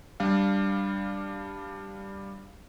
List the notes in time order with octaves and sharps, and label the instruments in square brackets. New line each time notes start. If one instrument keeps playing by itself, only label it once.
[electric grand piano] G3 D4 F5